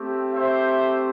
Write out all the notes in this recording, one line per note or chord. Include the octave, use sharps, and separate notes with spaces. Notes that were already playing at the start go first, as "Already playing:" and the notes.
Already playing: A3 C4 G4
C5 E5